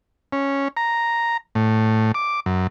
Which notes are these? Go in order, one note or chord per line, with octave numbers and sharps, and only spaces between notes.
C#4
A#5
A2
D6
F#2